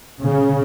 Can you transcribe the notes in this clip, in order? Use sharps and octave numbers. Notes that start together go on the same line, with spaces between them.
C#3